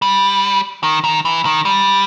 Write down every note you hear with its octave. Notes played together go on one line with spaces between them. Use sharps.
G3
D#3
D#3
E3
D#3
G3